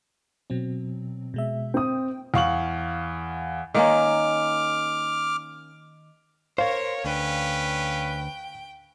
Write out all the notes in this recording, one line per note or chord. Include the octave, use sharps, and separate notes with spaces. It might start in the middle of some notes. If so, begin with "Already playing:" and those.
B2 F#3 C4
B2 G#3 E5
C4 G5 D#6
E2 F5 C#6 F#7
D#3 A#3 C#4 D6 F6
A#4 C5 C#5 F5
D2 C#4 D4 B4 G5